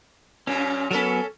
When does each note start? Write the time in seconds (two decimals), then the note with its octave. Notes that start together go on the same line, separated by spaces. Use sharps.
0.47 F#2 A#2 C#4
0.91 F#3 B3 C#4 A4 A#4